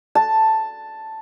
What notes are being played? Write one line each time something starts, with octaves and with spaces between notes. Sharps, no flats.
A5